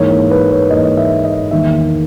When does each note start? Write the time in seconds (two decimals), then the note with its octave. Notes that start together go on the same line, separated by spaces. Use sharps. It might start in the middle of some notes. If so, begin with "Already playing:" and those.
Already playing: G#2 E3 A#3 C#5
0.10 C#5
0.31 B4
0.51 C#5
0.70 G#2 E3 A#3 D#5
0.97 E5
1.24 D#5
1.51 E2 D#3 A#3 E5